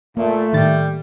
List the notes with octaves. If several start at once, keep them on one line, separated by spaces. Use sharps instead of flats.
A#2 A3 A#3
A2 D#3 G3 A6